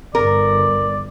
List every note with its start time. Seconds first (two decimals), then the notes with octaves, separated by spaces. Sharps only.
0.15 G1 A#4 D5